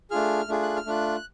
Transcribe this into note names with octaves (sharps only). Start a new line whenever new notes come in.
A3 D4 F4 G#4 F6
A3 D4 F4 G#4
F#6
F6
A3 D4 F4 F#6